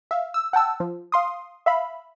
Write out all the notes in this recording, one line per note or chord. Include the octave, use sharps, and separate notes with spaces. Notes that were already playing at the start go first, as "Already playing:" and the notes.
E5 F5
E6
F#5 G5 A5 E6
F3
F5 C6 D#6
E5 F5 B5